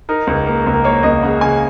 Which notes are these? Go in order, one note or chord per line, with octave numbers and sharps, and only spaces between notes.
D#4 A#4
C#2
A#3
C#2
A#4
A#3 C#5
C#2 D#5
C#3 F#5
C#3 G#5